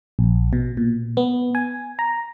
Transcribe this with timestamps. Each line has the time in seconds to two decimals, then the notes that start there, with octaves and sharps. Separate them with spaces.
0.19 A#1
0.53 B2
0.77 A#2
1.17 B3
1.55 G#5
1.99 A#5